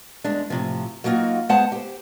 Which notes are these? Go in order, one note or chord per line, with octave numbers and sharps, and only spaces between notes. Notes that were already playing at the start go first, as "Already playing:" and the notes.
E2 G#3 D4
A2 C3 F3
F#3 G3 A#3 D#4 F4 F#4
G#3 B3 G#4 C5 F#5 A5
G4 C5